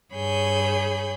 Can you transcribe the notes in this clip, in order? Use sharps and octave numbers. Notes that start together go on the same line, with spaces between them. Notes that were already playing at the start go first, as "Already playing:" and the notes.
G2 G#4 C#5 G#5 B5 G6